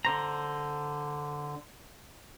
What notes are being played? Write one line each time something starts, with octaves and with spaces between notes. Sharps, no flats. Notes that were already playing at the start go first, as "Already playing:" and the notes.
D3 C5 A#5